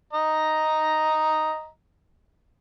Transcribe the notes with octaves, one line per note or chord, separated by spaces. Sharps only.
D#5 A#5